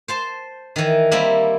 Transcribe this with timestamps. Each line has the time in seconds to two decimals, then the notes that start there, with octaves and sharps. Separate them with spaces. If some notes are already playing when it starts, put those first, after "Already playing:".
0.08 C5 A5 C6
0.76 D#3 E3
1.12 G3 A#3 C4 E4